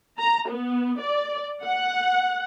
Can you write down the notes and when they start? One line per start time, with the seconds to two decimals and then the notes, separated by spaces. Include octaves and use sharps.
0.19 A#5
0.50 B3
1.00 D5
1.65 F#5